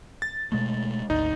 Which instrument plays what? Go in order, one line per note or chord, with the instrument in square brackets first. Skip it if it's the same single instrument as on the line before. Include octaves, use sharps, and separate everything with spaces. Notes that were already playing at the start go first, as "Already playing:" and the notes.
[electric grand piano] A6
[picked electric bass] B2 G#3 A3
[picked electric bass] G#1 D2 [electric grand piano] D#4